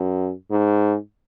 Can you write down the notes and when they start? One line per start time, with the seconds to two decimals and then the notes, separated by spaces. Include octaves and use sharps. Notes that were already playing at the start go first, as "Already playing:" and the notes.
Already playing: F#2
0.51 G#2